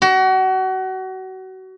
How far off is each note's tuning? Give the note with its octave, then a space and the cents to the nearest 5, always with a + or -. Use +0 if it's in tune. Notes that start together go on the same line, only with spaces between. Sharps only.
F#4 +30